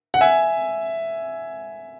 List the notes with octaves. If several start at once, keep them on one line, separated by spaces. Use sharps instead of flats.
F#5
E5 G#5